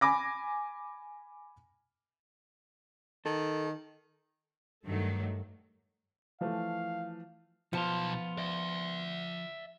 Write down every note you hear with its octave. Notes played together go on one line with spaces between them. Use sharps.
G#5 B5 D6 A#6
D#3 A4
G2 D#3 F#3 A3
E3 F3 A3 F5
B1 F3 B3 F4 A5
D5 E5